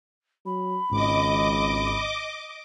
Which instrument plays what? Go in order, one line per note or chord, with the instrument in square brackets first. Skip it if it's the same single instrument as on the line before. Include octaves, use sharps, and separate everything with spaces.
[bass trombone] F#3 [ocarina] B5
[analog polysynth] G#1 [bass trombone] C#2 [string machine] D#5 D6